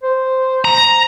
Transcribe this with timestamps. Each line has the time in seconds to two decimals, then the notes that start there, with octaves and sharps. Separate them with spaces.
0.03 C5
0.65 A#5